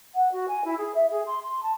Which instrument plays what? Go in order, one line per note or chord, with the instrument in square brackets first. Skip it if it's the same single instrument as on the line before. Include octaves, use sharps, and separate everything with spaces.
[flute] F#5
F#4
G#5
E4
G#4
E5
G#4
C6
C6
A5